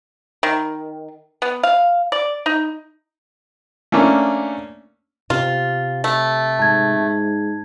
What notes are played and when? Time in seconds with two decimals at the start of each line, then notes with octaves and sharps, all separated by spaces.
0.43 D#3
1.42 B3
1.63 F5
2.12 D5
2.46 D#4
3.92 A3 A#3 C#4 D4 A#4
5.30 C3 F4
6.04 A3
6.59 G#2 A5 G#6